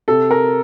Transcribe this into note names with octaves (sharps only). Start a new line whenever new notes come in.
C3 A4
A#4